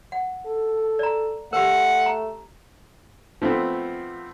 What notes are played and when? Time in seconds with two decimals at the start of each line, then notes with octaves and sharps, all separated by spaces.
0.12 F#5
0.46 A4
0.99 D5 A#5
1.53 A3 G4 A#4 F#5
2.06 A#5
3.42 F3 A3 B3 C4